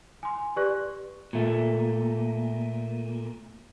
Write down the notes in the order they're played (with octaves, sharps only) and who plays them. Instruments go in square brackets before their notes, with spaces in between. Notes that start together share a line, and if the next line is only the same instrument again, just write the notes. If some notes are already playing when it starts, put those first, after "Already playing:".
[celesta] G#5 C6
G4 B4 D5 C#6 F#6
[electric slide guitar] A#2 A3